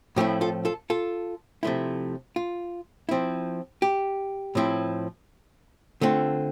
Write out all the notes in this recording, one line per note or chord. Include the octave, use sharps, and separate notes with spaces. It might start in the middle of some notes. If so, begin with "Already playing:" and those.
A2 F3 A3 C4 E4 G4
F4 A4
F4 A4
F4 A4
C3 F3 A3 E4
F4
F3 C4 E4
G4
A2 F3 C4 E4
D3 A3 C4 F4